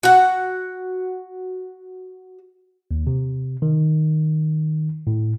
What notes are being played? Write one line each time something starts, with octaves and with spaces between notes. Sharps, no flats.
F#4 F#5
D#2
C3
D#3
A2